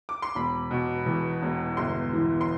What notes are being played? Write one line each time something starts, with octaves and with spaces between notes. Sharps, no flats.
D6
C6
E1 B5
B2
E2
E1
G1 C6
E3
C6